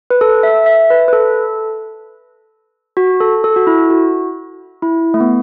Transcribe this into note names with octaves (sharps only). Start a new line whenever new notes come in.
B4
A4
E5
E5
B4
B4
A4
F#4
A4
A4
F#4
E4
F#4
E4
A3
B3